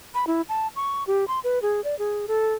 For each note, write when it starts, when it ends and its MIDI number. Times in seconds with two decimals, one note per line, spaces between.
0.14 0.25 83
0.27 0.42 64
0.49 0.68 81
0.76 1.04 85
1.07 1.27 67
1.28 1.40 84
1.44 1.61 71
1.62 1.83 68
1.84 1.97 74
1.99 2.26 68
2.28 2.54 69